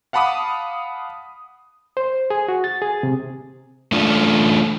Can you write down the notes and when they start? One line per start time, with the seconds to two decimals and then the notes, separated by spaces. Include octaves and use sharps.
0.13 F5 F#5 A5 B5 D6 D#6
1.97 C5
2.30 G#4
2.48 F#4
2.64 A6
2.82 G#4
3.03 C3
3.92 A3 D4 F4